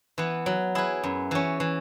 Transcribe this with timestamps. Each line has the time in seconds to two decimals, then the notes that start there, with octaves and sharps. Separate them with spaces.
0.18 E3 B3
0.46 F#3
0.75 E4 G#4 B4
1.03 F#2
1.31 E3 C#4
1.60 E3